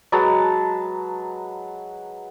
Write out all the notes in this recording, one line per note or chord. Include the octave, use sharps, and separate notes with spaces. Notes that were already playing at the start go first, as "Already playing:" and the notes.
F#3 G#3 B4 A5